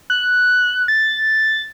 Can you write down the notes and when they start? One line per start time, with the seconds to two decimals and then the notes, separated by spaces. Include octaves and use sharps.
0.10 F#6
0.88 A6